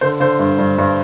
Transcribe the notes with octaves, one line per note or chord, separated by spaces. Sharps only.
D3 C5
D3 C5
G2
G2
G2